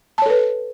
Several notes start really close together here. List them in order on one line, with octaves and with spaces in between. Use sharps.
A5 C#5 A4 B4